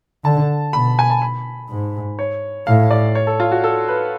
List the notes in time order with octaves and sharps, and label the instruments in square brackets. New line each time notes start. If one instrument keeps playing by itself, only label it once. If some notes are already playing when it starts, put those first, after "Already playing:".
[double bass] D3 [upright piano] A5
[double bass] B2 [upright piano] B5
[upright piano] G#5
A5
B5
[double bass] G#2
[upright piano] C#5
[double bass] A2 [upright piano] F5
[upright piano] D5
C#5
A4
F4
F#4
A4
B4